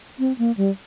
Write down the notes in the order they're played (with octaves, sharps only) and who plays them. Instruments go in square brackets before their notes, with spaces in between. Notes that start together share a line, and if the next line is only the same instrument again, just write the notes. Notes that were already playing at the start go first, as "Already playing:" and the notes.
[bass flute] C4
A#3
G3